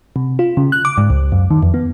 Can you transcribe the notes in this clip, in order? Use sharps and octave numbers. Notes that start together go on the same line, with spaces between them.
C3
F4
C#3
F#6
D6
G#2
C#2
F#2
D#3
F2
B3